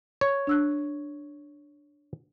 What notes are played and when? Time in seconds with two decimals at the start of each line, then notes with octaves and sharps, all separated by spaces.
0.21 C#5
0.47 D4 E6 F#6